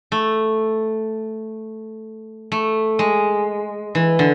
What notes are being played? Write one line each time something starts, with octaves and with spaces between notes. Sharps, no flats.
A3
A3
G#3
E3
D3